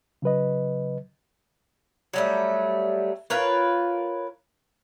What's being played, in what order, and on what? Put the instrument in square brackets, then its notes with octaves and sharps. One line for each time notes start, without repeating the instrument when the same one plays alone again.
[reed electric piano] C#3 F#3 B4 D#5
[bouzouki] F#3 G3 A3
F4 A#4 B4 C#5